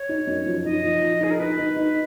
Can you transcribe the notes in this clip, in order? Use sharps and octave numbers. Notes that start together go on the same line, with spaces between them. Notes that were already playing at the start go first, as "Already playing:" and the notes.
Already playing: C#5
D#4
F#2
F3
D#4 D#5
F3
F3
D#4 G#4
A#4
D#4 B4
D#4
D#4